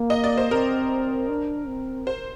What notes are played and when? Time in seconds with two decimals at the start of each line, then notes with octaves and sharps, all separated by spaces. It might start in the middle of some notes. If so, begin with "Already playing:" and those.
Already playing: A#3
0.10 D#5
0.24 D5
0.38 C5
0.51 C4 A#4
1.30 D4
1.67 C4
2.07 C5